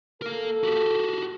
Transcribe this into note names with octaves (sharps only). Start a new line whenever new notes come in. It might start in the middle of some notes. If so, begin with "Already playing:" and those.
A4 A#4 F5
F#4 G4